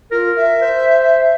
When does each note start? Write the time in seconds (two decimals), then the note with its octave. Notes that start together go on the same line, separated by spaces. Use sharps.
0.11 F4 A#4
0.36 E5
0.61 C5